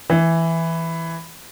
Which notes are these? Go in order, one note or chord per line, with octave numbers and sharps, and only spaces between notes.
E3